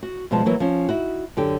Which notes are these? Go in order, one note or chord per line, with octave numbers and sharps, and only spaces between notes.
F#4
B2 F3 G3 G#3 A5
E3 F#3 A#3 F#4
F3 C#4
D#4 E4 F#4
F#2 D3 G4